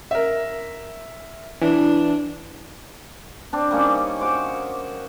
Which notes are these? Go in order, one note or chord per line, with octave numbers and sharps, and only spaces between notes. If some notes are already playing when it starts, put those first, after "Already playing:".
A#4 E5
E3 D4
C4 D4
G3 A#3 C#4 D#4
F#4 C5 D6